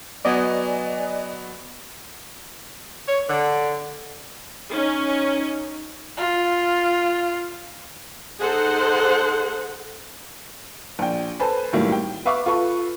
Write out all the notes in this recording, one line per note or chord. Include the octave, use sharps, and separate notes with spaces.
F#3 B3 F#4 D5 D#5 G#5
C#5
D3
C#4 D#4
F4
D#4 G#4 A4 C5 F#5
A#1 G5
A4 B4 C5 G#5 A5 B5
F#2 A2 D#3 G3 A#3 E4
G5
B4 E5 F5 C#6 D6
F4 A4 B4 C#6